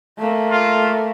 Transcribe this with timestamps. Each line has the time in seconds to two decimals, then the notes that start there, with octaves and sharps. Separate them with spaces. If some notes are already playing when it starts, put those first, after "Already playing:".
0.18 A3 A#3
0.50 F4